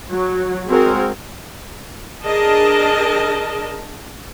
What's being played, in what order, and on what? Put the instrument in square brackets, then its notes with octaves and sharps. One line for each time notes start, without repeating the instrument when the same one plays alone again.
[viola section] F#3
G#3 C4 F#4 G#4 A#4
D4 G#4 A#4 D#5 A5